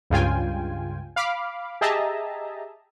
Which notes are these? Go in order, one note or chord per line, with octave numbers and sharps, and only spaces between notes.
C#2 G2 C#3 F4 G5 G#5
F5 B5 D6
G4 G#4 D#5 E5 A5 A#5